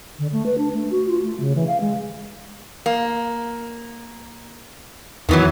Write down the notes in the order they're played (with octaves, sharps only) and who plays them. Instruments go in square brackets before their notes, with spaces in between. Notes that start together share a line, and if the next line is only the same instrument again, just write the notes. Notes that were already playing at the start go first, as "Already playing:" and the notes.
[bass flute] D3
A3
B4
D4
A3
F#4
F4
A3
C#3
E3
F5
G#3
[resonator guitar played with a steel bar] A#3
[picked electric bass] E2 B3 [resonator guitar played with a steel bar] D#3 E3 F#3